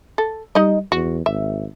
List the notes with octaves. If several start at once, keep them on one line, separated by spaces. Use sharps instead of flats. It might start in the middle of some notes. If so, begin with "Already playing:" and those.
A4
G3 D#4 D#5
E2 F#4
G#1 E5